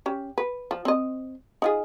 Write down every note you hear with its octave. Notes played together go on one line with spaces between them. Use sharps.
C#4 G4
B4
F3
C4 D#5
D#4 F4 G#4